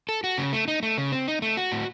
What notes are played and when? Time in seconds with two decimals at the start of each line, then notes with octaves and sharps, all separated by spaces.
0.09 A4
0.24 F#4
0.38 C#3
0.53 A3
0.68 D#4
0.83 A3
0.98 C#3
1.12 C4
1.28 D#4
1.42 A3
1.57 F#4
1.72 A2